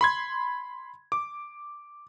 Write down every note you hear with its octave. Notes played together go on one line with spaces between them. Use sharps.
B5 C6 G#6
D6